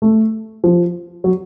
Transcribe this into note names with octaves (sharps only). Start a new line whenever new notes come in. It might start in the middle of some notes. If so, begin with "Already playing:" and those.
A3
F3
F#3